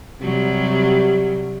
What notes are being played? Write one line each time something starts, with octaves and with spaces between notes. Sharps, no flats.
C3 F#3 G3